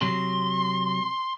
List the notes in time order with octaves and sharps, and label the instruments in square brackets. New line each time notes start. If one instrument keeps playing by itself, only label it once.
[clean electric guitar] C3 F#3 [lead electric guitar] C6